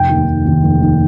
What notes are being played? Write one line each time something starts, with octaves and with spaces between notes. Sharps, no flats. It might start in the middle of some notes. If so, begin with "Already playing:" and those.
Already playing: F1 G5
D#2 D#3
F1
D#2 D#3
F1
D#2 D#3